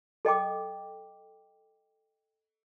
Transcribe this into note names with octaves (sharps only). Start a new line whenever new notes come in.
A4 D#5 G5 D6